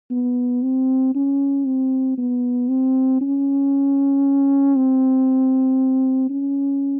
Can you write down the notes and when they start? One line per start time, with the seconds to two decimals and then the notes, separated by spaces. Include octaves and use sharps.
0.11 B3
0.63 C4
1.15 C#4
1.66 C4
2.18 B3
2.69 C4
3.21 C#4
4.76 C4
6.30 C#4